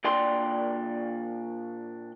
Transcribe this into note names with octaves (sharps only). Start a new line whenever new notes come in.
A#2 D4 D5 G5 C6